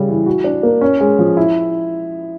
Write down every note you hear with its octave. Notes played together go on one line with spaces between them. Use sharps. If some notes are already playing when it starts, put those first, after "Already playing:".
Already playing: C#3 G3
E3
F#4
D4
A#3
C#4
G#3
F3
E4